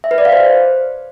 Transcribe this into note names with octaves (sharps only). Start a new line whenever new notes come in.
E5
B4
D5
F5
C5